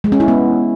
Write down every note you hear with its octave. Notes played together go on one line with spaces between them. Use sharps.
G#3
C#4
E4
B3